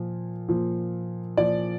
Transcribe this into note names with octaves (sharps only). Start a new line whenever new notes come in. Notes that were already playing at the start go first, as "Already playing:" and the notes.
Already playing: A#2 F3
A#2 F3
A#2 F3 D5